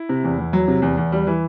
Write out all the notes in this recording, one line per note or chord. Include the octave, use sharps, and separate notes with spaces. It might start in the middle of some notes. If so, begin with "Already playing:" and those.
Already playing: E4
C3
E2
E2
F#3
C3
E2
E2
G3
E3